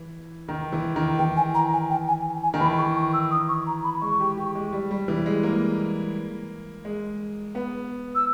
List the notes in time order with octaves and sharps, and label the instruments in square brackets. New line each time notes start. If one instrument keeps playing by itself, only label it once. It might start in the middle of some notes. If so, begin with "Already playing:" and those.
Already playing: [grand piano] E3
D#3
E3
D#3
[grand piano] E3 [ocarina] G5
[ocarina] G#5
A#5
G#5
G5
G#5
G#5
[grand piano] D#3
[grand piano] E3 [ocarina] B5
[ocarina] C#6
C#6
E6
D#6
C#6
A#5
B5
[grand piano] G#3 [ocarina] C#6
[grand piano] G4
G4
G#3
G3
G3
E3
G#3
A#3
G#3
B3
[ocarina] E6